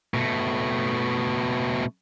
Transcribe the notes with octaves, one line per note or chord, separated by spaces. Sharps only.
B2 A3